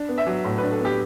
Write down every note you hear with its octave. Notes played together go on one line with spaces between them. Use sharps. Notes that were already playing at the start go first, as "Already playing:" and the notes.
Already playing: D4
B3
E5
F#3
A2
B4
D4
A4
B3 G4